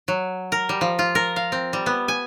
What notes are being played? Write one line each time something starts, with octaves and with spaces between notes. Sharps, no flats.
F#3
A#4
G3
F3
F4
A#4
F5
C4
G3
B3
G#5